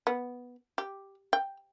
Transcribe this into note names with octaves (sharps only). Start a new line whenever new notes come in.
B3
G4
G5